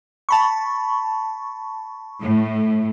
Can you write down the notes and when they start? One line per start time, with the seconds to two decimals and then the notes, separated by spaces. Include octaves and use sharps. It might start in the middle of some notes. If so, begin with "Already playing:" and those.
0.29 A5 B5 C#6
2.21 A2